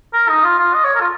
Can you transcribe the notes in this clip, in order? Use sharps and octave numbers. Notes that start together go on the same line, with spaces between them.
A#4
D#4
F4
F4
D#5
C#5
A#4
F4